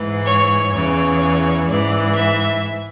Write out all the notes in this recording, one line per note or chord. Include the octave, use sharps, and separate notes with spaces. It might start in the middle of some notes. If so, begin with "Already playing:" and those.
Already playing: G#2 E3
C#5
E2 C#3 E3 C#5
G#2 E3 D5
E5